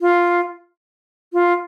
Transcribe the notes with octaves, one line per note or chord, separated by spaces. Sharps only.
F4
F4